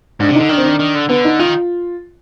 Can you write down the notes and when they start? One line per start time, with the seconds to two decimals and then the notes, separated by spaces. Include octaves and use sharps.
0.20 G#2 D4
0.29 C3
0.35 D3 D#4
0.49 D#3 D4
0.57 C4
0.64 D4
0.79 D#3
0.95 D3
1.09 D3 B3
1.25 D#4
1.39 D#3 F4